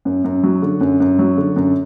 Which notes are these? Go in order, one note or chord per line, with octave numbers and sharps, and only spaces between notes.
F#2
F#2
F#3
D3
F#2
F#2
F#3
D3
F#2